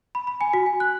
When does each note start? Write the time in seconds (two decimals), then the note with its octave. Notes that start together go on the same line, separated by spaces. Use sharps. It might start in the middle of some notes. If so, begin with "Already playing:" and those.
0.15 B5
0.27 B5
0.41 G#5
0.53 F#4
0.66 G#5
0.80 F#6